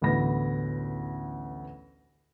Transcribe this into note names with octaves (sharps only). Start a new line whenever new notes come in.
A1 D2 B3 B5 A#6